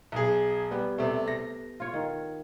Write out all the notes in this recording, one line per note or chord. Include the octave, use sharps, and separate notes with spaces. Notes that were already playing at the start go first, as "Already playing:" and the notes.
B1 G#4
G3 B3 G4
C3 A3 G4
A4 A#6
F4 C#5
D#3